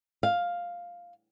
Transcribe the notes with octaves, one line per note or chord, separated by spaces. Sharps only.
F5